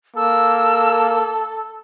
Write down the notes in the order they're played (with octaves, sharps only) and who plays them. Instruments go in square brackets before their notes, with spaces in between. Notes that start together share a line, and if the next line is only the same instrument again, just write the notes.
[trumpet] A#3 [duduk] A4 [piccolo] E6